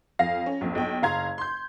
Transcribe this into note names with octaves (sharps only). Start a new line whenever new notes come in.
F2 F5 A#6
C#4
A#1 F2
B1 G5
F#1 F5 A#5 C6 G#6
C6 G6